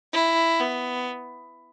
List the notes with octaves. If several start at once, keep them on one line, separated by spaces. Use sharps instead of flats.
E4
B3